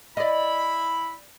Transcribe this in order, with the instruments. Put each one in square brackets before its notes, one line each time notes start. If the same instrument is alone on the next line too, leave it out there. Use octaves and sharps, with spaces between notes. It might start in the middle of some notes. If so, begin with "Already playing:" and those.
[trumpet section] E4 B5 [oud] D5 D#5